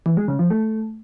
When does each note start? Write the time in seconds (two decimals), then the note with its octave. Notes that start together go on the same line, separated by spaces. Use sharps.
0.06 E3
0.17 G#3
0.28 C#3
0.39 F3
0.50 A3